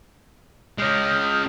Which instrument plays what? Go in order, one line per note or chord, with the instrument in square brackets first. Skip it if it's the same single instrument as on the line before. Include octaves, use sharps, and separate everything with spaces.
[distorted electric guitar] G#3 C#4 [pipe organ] D#6 F6 G6